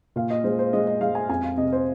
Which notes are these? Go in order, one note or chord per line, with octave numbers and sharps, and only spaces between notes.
A#2 F5
D#5
G#3 C5
C5
G#3 D#5
D#5
G#3 F5
G#5
F2 G#5
F5
C3 D#5
C5